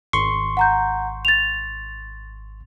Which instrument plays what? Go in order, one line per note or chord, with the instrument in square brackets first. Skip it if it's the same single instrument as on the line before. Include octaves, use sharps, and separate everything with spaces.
[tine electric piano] G#1 C6 C#6
[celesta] F#5 A#5 G6
A6 F7